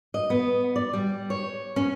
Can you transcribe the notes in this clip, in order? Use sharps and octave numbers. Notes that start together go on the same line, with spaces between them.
D#5
B3
D5
G3
C#5
C#4